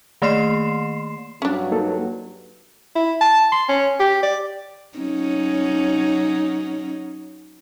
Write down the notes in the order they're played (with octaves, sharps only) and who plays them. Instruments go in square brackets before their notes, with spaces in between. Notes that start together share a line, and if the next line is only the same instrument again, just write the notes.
[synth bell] D#3 A3 A#3 C6 C7 E7
[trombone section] G2 F#3 [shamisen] C#4 D4
[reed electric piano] A#3 D#4 A4
[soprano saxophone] E4
A5
C6
C#4
G4
D5
[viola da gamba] F#3 C#4 D#4